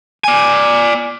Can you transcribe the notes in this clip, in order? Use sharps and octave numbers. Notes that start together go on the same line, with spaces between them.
D5 G#5